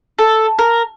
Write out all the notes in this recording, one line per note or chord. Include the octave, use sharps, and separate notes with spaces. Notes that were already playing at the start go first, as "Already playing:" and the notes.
A4
A#4